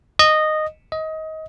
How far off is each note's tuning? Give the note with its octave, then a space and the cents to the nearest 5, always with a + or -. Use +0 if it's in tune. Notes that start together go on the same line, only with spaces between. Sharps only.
D#5 -10
D#5 +25